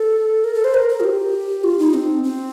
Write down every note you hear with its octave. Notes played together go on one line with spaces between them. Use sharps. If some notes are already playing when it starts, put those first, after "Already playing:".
Already playing: A4
A#4
A4
C5
A#4
A#4
F4
G4
F4
D#4
C4
C4